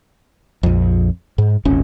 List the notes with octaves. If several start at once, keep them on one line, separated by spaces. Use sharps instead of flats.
A#1 F2
G#2
D#1 G#1 C#4